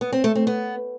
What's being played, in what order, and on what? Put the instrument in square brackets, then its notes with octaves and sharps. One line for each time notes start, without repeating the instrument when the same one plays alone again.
[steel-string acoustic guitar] B3
C4
A3
C4
B3